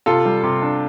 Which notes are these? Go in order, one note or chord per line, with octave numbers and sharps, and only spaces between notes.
C3 F4 A4
G3
C3
D4